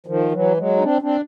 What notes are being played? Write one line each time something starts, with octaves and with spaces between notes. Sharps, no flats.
D#3 F3
E3 F#3
F#3 G#3
D#4
C4 D4
C4 D4